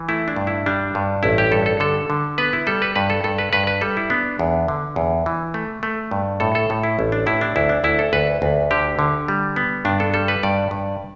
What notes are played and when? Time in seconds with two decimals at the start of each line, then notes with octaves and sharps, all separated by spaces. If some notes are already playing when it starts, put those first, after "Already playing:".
Already playing: E3
0.09 A3 E4
0.28 D4
0.36 G2
0.47 E4
0.66 G3 D4
0.95 G2
1.23 A1 E4
1.38 G4
1.51 G2 A4
1.66 A4
1.80 D3 A4
2.10 D3
2.38 B3 B4
2.53 E4
2.67 G3 A4
2.82 B4
2.95 G2 B4
3.10 A4
3.24 G2 A4
3.38 B4
3.53 G2 B4
3.67 B4
3.81 G3 A4
3.97 E4
4.10 B3 D4
4.39 E2
4.68 D3
4.96 E2
5.26 E3
5.54 A3
5.83 A3
6.11 G2
6.40 A2 A4
6.55 A4
6.70 A2
6.83 E4
6.99 A1
7.12 D4
7.26 A2 E4
7.41 D4
7.56 D2 E4
7.69 D4
7.84 D2 E4
7.99 A4
8.13 D2 B4
8.42 D2
8.71 D3 G4
8.99 D3
9.28 G3
9.56 B3
9.85 G2 D4
10.00 A4
10.14 G3 A4
10.28 B4
10.43 G2 D5
10.71 G2